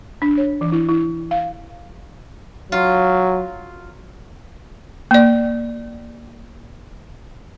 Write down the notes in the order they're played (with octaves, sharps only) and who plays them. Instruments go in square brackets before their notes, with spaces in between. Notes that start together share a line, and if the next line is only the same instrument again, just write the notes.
[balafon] D4
C#5
E3
E4
E4
F5
[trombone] F#3 [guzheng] F4
[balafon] A#3 D5